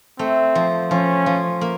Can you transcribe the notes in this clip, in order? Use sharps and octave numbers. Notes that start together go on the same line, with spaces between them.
A3 C4
F3
F3 C#4
F3
A#3